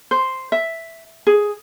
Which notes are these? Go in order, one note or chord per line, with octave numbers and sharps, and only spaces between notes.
C5
E5
G#4